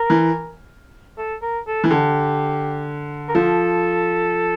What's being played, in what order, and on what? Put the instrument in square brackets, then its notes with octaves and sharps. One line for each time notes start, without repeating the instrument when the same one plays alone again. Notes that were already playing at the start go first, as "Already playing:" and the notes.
Already playing: [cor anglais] A#4
[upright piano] E3
[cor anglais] A4
A#4
A4
[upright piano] E3
[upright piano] D3 [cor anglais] G4
[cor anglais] A#4
[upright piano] F3 [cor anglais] A4